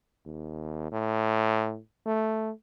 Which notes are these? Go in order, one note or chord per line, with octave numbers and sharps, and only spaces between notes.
D#2
A2
A3